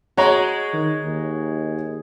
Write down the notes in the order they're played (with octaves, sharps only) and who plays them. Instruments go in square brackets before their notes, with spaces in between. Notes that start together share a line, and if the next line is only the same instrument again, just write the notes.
[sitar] G#3 [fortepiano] F#4 C#5 A#5
[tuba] D#3
D#2